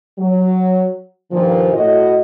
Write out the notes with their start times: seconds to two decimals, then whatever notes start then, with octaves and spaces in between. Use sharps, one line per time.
0.19 F#3
1.31 G2 A#2 D#3 F3
1.73 A2 F#4 D#5